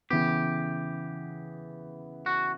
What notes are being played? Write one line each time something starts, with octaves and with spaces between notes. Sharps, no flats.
C#3 E3 B3 G4
F#4